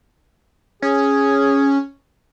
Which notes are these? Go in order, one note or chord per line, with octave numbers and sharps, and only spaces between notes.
C#4 G#4